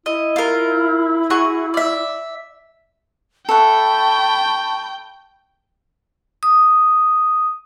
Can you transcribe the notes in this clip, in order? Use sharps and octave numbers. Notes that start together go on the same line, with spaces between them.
E4 D#5
F4 A#4
F#4 G#4 C#6
D5 E5
A4 E5 F#5 G5 A5 B5 C#6
D#6